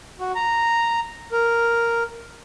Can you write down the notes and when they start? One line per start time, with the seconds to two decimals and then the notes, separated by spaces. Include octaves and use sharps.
0.19 F#4
0.35 A#5
1.32 A#4